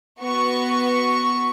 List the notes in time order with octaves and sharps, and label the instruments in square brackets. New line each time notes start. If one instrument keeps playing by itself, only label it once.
[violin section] B3 F#4 C#6